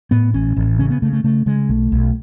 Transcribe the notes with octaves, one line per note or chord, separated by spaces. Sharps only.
A2 B3
A1 C#4
A1
C#3 C#4
B3
C#3 A3
A3
C#3 A3
C#3 G#3
B1 A3
B1